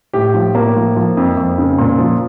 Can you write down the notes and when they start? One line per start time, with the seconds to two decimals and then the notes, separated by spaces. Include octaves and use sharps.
0.13 A2 G4
0.34 F3
0.55 A2 A#3
0.76 F3
0.96 F3
1.17 F2
1.37 F2
1.58 C#3
1.78 A#2
1.98 F3